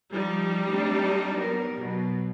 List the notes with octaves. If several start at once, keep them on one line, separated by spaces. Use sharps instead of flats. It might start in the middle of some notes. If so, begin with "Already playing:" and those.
F3 G3 D#4
A3 C4 D4
F#3 B3 A#4
B2 F#3